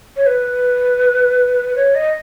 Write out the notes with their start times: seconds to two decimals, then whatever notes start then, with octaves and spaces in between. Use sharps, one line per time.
0.16 C#5
0.26 B4
1.76 C#5
1.95 D#5